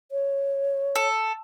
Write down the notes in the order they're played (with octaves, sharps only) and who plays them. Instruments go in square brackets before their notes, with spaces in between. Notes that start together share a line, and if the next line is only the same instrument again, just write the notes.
[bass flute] C#5
[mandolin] A4